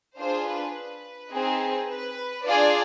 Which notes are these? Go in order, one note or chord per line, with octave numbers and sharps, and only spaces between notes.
D4 F4 G#4 C5
B4
B4
C4 D#4 G#4
B4
D4 F4 G#4 D5